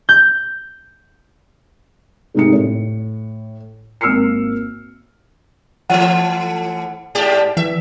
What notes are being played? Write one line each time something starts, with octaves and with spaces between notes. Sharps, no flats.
G6
G#2 C3 A3 D#4 G4 C#7
A2
G#1 A#3 E6 F6 C7 C#7
E3 A3 F#5
G#2 G4 D5
E3 E5